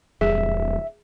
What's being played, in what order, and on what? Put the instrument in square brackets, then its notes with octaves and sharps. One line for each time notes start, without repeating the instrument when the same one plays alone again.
[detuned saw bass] D1 [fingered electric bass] E2 G3 [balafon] G#4 [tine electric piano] E5